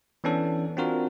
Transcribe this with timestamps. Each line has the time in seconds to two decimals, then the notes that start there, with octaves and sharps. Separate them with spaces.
0.24 E3 B3 C#4 D4 A4
0.77 C4 D4 F4 F#4 A#4